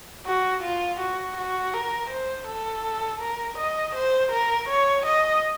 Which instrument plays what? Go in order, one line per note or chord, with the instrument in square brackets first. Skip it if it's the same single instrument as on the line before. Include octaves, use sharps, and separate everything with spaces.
[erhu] F#4
F4
F#4
F#4
A#4
C5
A4
A#4
D#5
C5
A#4
C#5
D#5